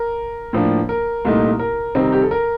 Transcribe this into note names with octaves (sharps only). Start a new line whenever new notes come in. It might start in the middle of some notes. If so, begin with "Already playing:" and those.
Already playing: A#4
A2 F3 A#3 D4
A#4
C2 A#2 A3 D#4
A#4
C3 D#3 G3 C4 D#4
G4
A4
A#4